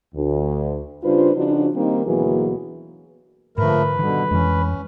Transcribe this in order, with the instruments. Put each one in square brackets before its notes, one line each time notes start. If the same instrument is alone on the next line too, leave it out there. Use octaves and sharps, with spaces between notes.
[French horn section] D2
C#3 G3 D4 F4 B4 C5
C#3 F3 D4 D#4 F#4
D#3 G3 A#3 C4 D#4
D2 B2 E3 F#3 A#3 G#4
[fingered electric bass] G#2 D3 [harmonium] F3 A3 A#4 [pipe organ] B4
[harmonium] B2 D3 [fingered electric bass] D#3 F3 G3
[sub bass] F2 [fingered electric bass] E3 G#3 [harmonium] C#4